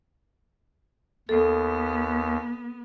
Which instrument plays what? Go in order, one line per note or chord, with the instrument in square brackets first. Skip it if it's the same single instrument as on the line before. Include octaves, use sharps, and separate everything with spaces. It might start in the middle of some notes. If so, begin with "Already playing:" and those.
[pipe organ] D#2 [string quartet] B3 [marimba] A4